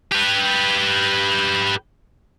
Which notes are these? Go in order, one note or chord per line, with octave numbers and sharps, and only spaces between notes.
G4 B4